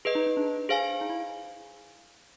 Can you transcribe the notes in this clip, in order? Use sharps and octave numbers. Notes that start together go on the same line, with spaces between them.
G#4 B4 D#5
D#4
D#4
D4
G#4 C5 F5 G#5
D#4
E4